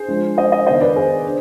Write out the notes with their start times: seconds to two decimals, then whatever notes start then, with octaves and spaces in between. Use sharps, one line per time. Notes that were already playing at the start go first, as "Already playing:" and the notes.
Already playing: G#4 C5
0.08 F3 G#3 D4
0.37 C5 D#5
0.52 C5 D#5
0.66 D#3 B3 D4 C5 D#5
0.81 B4 D5
0.96 G#4 C5
1.24 D4